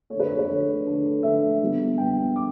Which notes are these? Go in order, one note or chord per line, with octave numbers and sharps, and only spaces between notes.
D3 A3 C#5
B4
C#5
B4
D3 A3 C#5
D3 A3
D3 A3 E5
D3 G3 B3
D3 G3 B3 G5
D3 D6